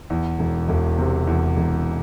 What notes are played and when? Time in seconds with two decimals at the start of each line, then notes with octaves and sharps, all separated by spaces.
0.10 E2
0.39 E1
0.68 E1
0.98 C3
1.27 E2
1.57 E1